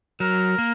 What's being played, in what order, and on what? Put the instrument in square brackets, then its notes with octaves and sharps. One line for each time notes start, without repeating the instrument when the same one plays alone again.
[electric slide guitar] F#3 [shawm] A#4
[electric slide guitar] A#3